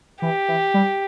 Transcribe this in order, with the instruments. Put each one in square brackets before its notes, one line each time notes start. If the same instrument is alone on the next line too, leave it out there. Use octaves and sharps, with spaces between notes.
[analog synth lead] E3 [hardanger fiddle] G4
[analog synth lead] E3
G3